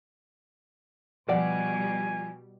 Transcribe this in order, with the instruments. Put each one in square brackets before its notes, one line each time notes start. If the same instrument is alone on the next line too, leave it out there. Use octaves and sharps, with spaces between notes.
[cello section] B2 G3 [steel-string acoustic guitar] F3 [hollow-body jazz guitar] D5 F#5 [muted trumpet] G#5